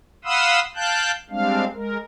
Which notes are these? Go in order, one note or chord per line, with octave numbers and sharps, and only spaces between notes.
F5 F#5 B5 C6 D#6 E6
F5 G5 A5 F#6 G6
G3 G#3 C4 D4 F5
G#3 A#4